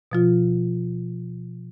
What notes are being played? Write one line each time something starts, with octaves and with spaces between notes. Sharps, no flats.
B2 F3 F4